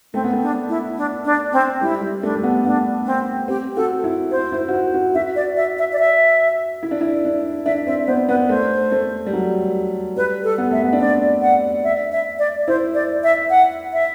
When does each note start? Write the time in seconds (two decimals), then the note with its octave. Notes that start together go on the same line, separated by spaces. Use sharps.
0.13 A3 C4
0.24 B3
0.33 A3
0.42 D4
0.69 E4
0.97 D4
1.25 D4
1.53 C4
1.81 G3 E4
2.01 G3
2.22 A3 D4
2.35 A3
2.43 B3
2.65 B3 D4
3.06 C4
3.48 C4 G4
3.76 F#4 A4
4.04 E4
4.31 E4 C5
4.52 E4
4.68 F#4
4.74 E4
4.94 F#4
5.15 F#4 E5
5.36 D5
5.57 E5
5.78 E5
5.93 D5
5.99 E5
6.83 E4
6.91 D4
7.01 E4
7.25 D4
7.66 D4 E5
7.87 C4 E5
8.07 B3 C5
8.29 B3 B4
8.49 A3 C5
8.92 A3
9.26 G3
9.33 F#3
10.16 G3 B4
10.44 A4
10.58 B3
10.71 A3 E5
10.84 B3
10.93 D4
11.00 C4 D5
11.42 F#5
11.84 E5
12.12 E5
12.39 D5
12.67 E4 C5
12.95 D5
13.24 E5
13.50 F#5
13.93 E5